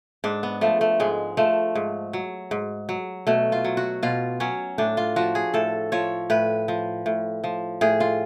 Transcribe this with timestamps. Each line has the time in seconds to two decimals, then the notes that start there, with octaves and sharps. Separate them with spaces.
0.24 G#2 D4
0.43 B3
0.61 F3 A3
0.81 A3
1.00 G#2 G#3
1.37 F3 A3
1.75 G#2
2.13 F#3
2.51 G#2
2.89 F#3
3.27 B2 A3
3.52 F4
3.64 F#3
3.77 F#4
4.03 B2 F4
4.40 F#3 C#4
4.78 A2 D4
4.97 F4
5.16 F3 F#4
5.35 G#4
5.54 A2 A4
5.92 F3 C#5
6.30 A2 B4
6.68 F3
7.06 A2
7.44 F3
7.81 A2 G#4
8.00 F4